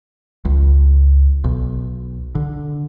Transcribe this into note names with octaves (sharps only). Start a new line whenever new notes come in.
C#2
B1
D3